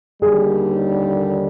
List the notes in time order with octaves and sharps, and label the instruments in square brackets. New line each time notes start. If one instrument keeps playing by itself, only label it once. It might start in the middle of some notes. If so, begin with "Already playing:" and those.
[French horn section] D#2 D3 G3 [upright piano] G#4